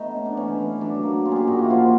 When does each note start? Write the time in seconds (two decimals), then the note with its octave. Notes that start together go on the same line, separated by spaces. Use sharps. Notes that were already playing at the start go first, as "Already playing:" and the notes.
Already playing: A3 B3 D#4 B4
0.15 C#4
0.26 D4
0.37 E3 C#4
0.59 E3
0.81 F#3 D4
1.03 A#3
1.26 C#4 F4
1.32 G4 G#4
1.48 A#2 F#4
1.59 F#4
1.65 E4
1.70 F3 F4